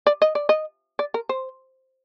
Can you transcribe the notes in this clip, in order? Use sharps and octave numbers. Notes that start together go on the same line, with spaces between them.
D5
D#5
D5
D#5
D5
A#4
C5